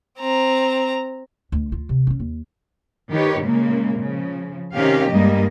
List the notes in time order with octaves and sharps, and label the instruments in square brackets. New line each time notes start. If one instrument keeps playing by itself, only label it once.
[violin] C4 A#5
[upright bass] D2
F4
C3
C#4 D4
D#2
[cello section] D#3 G4 B4 C#5
A#2 C#3 G#3 A#3
C#3 F3
C3 D#3 C4 C#4 G4 F5
G2 G3 G#3 A#3 D#5